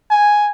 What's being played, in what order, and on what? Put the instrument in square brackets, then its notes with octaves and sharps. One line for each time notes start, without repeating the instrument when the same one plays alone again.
[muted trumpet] G#5